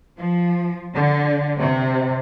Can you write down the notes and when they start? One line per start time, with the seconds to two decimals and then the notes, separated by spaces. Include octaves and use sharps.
0.18 F3
0.94 D3
1.59 C3